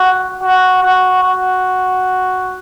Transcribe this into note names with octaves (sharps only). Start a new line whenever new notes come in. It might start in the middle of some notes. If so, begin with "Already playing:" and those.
Already playing: F#4
F#4
F#4
F#4